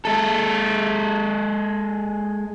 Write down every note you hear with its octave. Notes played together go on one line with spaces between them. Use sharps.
G#3 A4